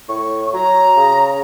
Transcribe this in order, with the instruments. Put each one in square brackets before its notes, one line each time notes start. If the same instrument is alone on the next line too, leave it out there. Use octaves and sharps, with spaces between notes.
[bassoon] A2 [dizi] C#6
[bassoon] F#3 [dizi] A#5
[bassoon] C#3